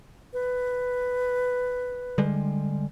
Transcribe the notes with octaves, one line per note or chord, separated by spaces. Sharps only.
B4
D3 G3 G#3